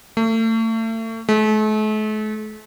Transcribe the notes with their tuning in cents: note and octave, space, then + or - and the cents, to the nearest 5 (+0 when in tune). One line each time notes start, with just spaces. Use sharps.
A3 +35
A3 -40